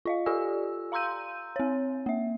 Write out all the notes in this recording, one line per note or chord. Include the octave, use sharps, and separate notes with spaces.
F4 D#5 F5
F4 G4 A4 D5 G#5 E6
F5 A#5 C6 E6 G6 D#7
C4 C#5
A#3 E5